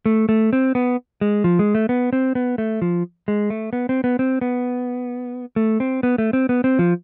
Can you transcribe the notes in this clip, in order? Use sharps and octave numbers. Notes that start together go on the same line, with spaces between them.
A3
A3
C4
B3
G#3
F3
G#3
A3
B3
C4
B3
A3
F3
G#3
A3
B3
C4
B3
C4
B3
A3
C4
B3
A3
C4
B3
C4
F3